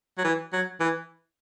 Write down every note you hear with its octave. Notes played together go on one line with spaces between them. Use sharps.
F#3
E3
F#3
E3